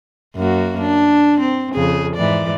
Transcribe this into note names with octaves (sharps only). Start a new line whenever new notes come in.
F#2 A#3 F#4
D4
C4
F2 C#3 G#4
G#2 E3 D5